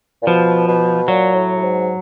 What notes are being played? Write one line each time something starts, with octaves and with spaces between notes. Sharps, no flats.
A#2
B2 F3
B2
A#2 F#3
A2
A2
G#2